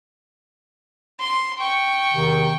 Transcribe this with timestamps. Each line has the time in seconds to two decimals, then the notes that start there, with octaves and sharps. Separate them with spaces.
1.20 C6
1.59 G5 C#6
2.12 E2 C3 D#3